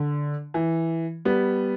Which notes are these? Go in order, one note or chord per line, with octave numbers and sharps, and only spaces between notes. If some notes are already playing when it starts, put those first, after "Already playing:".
Already playing: D3
E3
G3 B3